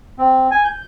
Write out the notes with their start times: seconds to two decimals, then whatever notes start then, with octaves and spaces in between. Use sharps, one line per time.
0.18 C4
0.51 G#5
0.65 G6